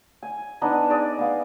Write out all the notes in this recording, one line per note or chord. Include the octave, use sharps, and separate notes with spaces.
G#5
B3 D4 D#4 D#5
G#4 D5 A#5 D#6
B3 F5